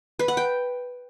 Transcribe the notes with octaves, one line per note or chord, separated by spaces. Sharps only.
B4
F#5
G5